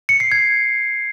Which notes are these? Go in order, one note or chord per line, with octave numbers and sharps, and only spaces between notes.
C#7
C7
G#6